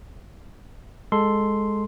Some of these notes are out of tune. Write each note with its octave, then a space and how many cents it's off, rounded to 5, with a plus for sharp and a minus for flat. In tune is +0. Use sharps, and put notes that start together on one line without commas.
G#3 -5 A4 +0 C6 +0